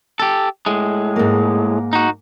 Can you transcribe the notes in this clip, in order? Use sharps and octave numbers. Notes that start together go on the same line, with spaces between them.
G4 A4
A2 G#3
G#2 A#3
D#4 F#4